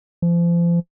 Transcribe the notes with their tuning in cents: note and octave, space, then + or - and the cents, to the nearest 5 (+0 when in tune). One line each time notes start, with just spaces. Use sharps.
F3 -35